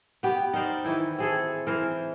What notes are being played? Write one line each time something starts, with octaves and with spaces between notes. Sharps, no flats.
B3 G4
D#4 A#4 C5 D5
D#3 E3 E4
C4 G#4 A4
E3 A#4 C5